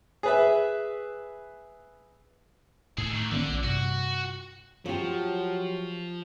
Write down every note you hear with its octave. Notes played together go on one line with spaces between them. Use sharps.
G#4 B4 E5
A2 G#4 A4
D#3 A3
D3 D#3 A#3 C#4
A#1
G2 C3 F#4
F3 F#3 G4 C#5